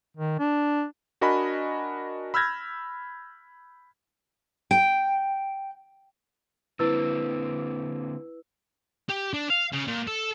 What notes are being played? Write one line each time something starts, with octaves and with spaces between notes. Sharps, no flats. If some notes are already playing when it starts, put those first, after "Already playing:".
D#3
D4
D4 F#4 A#4 D#5 G#5 B5
B5 E6 F6 G6 G#6 A#6
G5
D3 A#3 C4 E4 B4 E6
G4
D4
F5
C#3
A#2
A4